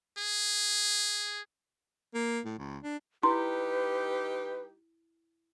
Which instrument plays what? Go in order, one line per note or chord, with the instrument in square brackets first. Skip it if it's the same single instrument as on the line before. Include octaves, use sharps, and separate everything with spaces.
[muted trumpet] G#4
[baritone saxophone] A#3
A2
C#2
D4
[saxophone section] G3 D#4 G4 [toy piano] E4 [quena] B4 [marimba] C6